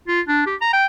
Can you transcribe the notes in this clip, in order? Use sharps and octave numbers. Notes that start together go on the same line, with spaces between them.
F4
D4
G4
A#5
G5